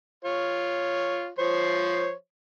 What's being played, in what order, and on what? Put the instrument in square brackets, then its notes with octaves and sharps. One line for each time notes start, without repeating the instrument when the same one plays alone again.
[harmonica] F4 C#5
F3 C5 C#5